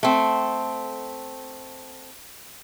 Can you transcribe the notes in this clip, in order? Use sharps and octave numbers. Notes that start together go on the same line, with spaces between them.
A3 C4